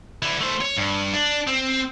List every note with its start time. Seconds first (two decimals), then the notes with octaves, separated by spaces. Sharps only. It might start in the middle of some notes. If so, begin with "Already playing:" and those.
0.22 D3 E4
0.41 A3 C5
0.61 C#5
0.77 G2
1.14 D4
1.47 C4